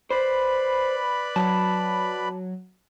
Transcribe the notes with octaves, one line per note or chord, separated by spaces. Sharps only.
B4 C5 D5 B5
F#3 A5